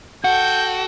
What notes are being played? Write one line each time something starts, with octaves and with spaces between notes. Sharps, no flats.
F#4 A4 F#5 G5 G6